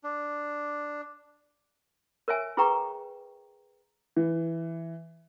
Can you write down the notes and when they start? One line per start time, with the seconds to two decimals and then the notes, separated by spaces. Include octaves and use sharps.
0.04 D4
2.28 A#4 C#5 E5 G#5
2.57 E4 G#4 B4 G5 A#5 C#6
4.16 E3